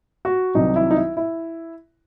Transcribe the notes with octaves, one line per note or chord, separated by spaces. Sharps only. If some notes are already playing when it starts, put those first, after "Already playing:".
F#4
C2 C3 D#3 F#3 D#4
E4
D#4
E4
E4